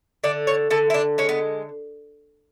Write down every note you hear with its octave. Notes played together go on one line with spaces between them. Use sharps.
D3 D5
C#5
D3 A4
E4
D4
G#3 C#4
B3